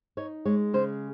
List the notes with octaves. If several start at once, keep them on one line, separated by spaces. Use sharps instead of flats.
D#4 C#5
G#3 C#5
C#3 C5